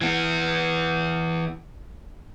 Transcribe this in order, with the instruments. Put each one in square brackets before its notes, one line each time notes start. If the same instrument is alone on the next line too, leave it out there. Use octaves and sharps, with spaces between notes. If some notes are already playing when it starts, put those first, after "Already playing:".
[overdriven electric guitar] E3 B3